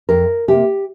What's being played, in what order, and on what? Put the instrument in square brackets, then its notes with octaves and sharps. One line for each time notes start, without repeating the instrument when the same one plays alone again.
[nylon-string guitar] F2 A#4
C3 A#3 G4